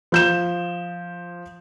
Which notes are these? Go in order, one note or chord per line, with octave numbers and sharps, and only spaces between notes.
F3 G6 E7